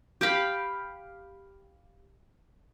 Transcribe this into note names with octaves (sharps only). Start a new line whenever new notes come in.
G4 F5 B5